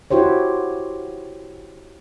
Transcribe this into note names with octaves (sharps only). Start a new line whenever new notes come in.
E4 F#4 G4 C5 C#5